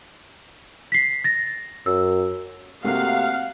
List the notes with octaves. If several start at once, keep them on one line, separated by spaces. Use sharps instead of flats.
B6 C7
A6 A#6
F#2 E6
C3 A3 A#3 F#4 F5 F#5